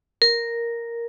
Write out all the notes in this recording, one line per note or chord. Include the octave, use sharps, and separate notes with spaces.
A#4